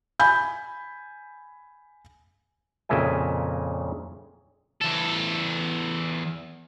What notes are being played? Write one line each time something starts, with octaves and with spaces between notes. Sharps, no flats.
G#5 B5 G6
F2 A#2 C#3 A#4 E5 G#5
E2 A4